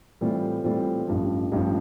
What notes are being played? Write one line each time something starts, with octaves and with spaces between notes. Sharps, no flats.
A2 E3 G3 C4 F4
A2 E3 G3 C4 F4
A1 G2 F3
A1 G2 F3